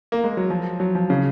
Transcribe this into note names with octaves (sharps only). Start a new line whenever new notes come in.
A#3
G#3
F#3
F3
F#3
F3
C#3